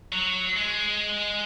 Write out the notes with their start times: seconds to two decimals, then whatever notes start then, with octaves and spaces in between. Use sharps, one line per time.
0.12 F#3
0.57 G#3